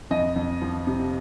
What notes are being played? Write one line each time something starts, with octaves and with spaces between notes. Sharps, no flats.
F2 D#5
F2
F3
C3